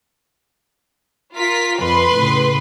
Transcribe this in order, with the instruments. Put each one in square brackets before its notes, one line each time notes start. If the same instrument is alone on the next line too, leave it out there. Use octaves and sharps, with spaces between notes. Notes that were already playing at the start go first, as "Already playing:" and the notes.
[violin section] F4 A#4 B6
[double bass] F2 [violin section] B4 B5 C6
[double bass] A2 C#3